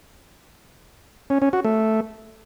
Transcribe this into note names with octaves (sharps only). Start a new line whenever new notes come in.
C#4
C#4
F#4
A3